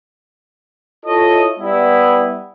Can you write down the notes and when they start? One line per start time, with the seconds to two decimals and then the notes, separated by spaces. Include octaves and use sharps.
1.06 E4 F4 A4 C#5 D#5
1.59 G3 B3 E4